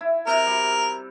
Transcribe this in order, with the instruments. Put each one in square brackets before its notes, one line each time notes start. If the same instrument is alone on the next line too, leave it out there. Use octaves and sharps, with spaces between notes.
[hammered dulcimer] E4
[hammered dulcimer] C3 [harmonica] A#4
[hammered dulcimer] G3